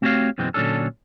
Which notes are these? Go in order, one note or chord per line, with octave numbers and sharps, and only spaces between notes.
A3 C4 F#4 G4 C#5 F5
F#2 B2 E3 G#3 C4
A#2 D3 F#3 C#4 D4 A4